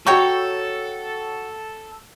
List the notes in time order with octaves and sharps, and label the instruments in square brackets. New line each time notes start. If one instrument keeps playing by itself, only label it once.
[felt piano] F#4 C#6 [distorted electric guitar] A4 [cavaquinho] C#5 G5 A#5